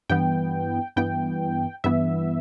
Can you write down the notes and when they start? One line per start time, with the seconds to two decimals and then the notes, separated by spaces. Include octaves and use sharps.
0.09 G2 E3 B3 G5
0.96 G2 E3 B3 G5
1.84 G2 E3 B3 E5